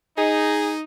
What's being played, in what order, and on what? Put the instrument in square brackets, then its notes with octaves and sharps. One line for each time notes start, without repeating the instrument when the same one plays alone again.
[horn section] D#4 [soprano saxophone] G#4